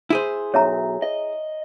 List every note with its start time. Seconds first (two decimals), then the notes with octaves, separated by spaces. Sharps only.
0.10 E4 G#4 C5
0.54 B1 C#5 E5 A#5
1.02 D#5